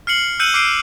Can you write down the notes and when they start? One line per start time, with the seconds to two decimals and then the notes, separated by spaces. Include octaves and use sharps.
0.07 F6 C7 C#7 F#7
0.40 E6 F#6 G6 C#7 D#7 F#7
0.54 D6 E6 F6 C7 D7 D#7